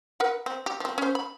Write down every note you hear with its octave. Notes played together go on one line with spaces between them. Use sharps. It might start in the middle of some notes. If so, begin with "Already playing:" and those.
A#4 B4 F#5
C4
G4
F3 C4
C#4 C5
B5